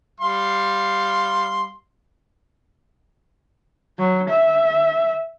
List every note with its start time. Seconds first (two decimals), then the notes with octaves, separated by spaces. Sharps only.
0.20 G3 F5 C6
3.98 F#3
4.29 E5